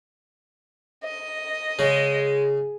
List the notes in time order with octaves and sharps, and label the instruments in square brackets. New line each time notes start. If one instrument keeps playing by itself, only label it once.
[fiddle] D#5
[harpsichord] C#3 [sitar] G#3